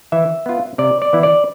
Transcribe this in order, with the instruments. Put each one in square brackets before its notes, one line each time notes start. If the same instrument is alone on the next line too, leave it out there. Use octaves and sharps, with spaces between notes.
[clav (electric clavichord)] E3 E5
B3 F4
C3 D5
D5
E3 B3 E4
D5